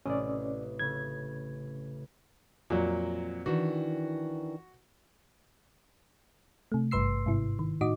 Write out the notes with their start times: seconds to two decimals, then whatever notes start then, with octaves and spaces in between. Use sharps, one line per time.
0.06 A1 C3 C#4 D5 D#5
0.79 C#3 A3 G#6
2.70 F2 A#2 F#3
3.46 D#3 E3 D4 F#4
6.72 C3 A3
6.91 G#1 G2 B4 C6 E6 C7
7.26 G#2 C3 E4
7.59 D#3
7.81 A2 D#4 F#4 D#5 D6